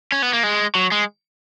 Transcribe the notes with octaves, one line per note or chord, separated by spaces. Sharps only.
C#4
B3
A#3
G#3
F#3
G#3